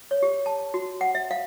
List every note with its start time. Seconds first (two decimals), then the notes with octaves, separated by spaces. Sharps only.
0.11 C#5
0.23 G4
0.46 A5
0.74 F#4
1.01 F#5
1.15 E5
1.31 F5